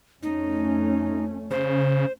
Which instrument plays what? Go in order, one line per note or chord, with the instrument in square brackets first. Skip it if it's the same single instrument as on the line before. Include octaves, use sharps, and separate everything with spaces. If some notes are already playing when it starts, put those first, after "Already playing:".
[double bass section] F2 A3 C#4 [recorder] D#4
[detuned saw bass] C#3 [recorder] C5